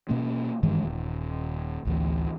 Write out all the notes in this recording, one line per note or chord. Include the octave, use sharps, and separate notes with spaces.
B2 A#3 C#4
G2 D#3 E3 G#3
D#1
A1 D2 E3